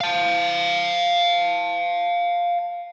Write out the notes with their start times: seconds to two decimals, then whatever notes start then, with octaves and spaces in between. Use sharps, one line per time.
0.01 F5 A5